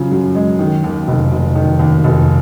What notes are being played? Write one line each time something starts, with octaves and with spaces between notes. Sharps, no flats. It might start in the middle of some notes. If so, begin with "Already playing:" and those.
Already playing: F#2 C#3 F3
F#2
G#3
D#3
D#2
F1
F1
D#3
D#2
F1